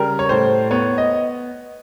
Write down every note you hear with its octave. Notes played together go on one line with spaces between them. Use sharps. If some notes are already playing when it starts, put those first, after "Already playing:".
Already playing: C#3 G3 A#4
C#5
A2 C5
B3 C#5
D#5